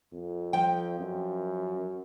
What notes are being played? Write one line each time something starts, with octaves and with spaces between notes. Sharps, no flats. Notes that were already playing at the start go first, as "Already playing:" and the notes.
F2
F3 G5
F#2